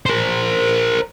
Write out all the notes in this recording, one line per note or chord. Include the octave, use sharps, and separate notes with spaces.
A#4 C5